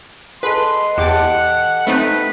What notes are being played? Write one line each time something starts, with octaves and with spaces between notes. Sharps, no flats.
G#4 A4 B4 D#5 C6
E2 G4 F#5 A5 D6
A3 C4 D#4 B4